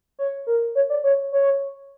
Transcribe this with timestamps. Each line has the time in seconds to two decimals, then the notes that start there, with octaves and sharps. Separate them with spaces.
0.19 C#5
0.47 A#4
0.75 C#5
0.90 D5
1.04 C#5
1.33 C#5